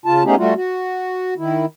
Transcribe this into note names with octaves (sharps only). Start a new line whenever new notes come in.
C#3 F4 A5
A3 B3 C#4 D#4 G4 G#4
G3 A3 F4 F#4
F#4
D#3 E4